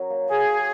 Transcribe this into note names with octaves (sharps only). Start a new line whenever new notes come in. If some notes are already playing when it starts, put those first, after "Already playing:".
Already playing: F#3 C#4 A#4 C#5
A#3
A#3 G#4
C#5